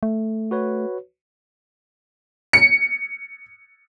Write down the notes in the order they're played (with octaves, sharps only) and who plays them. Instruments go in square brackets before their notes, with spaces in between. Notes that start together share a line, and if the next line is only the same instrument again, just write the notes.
[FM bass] A3
[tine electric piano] F#4 B4 C#5
[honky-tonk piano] C#7